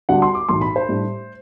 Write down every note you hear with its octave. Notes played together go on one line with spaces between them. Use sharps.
D2 D3 G3 D4 F#5
C6
D6
B1 A2 E3 C6
B5
C5
A2 G3 D4